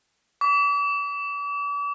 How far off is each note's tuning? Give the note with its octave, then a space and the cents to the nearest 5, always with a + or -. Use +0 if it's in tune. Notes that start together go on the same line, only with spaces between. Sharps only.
D6 -40